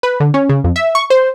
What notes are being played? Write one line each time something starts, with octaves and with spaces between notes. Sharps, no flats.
B4
D3
C#4
C#3
F2
E5
C#6
C5